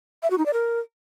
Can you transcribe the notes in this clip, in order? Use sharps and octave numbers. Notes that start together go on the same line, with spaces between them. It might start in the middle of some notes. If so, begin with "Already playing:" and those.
E5
F#4
D#4
D5
A#4